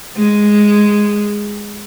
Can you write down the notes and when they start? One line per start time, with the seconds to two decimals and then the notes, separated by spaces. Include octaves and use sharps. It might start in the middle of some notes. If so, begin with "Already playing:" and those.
0.17 G#3